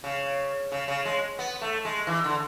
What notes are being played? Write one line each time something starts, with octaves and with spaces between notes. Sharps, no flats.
C#3
C#3
C#3
G#3
B3
A3
G#3
E3
D3